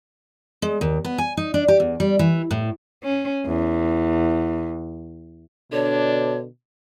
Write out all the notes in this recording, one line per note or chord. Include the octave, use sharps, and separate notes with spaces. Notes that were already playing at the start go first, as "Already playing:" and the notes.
G#3
D#2
B3
G#5
D#4
D4
G4
E2
G3
E3
A2
C#4
E2
B2 D3 D4 C#5